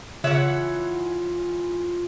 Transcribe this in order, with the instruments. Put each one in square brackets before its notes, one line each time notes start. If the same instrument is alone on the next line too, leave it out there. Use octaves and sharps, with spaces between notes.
[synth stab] C#3 [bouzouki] E3 F#5 [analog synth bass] F4 [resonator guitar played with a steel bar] C#5 E5